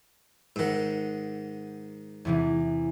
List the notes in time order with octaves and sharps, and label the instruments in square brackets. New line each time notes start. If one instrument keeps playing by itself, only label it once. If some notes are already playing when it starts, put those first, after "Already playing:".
[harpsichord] G#2 D#3 [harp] F#5 E6
[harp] E2 C3 E3